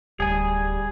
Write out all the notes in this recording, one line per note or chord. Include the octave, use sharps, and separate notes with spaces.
D1 G3 G#4 G#5